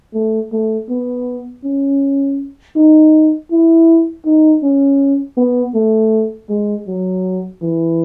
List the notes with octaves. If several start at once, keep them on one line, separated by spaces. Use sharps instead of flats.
A3
A3
B3
C#4
D#4
E4
D#4
C#4
B3
A3
G#3
F#3
E3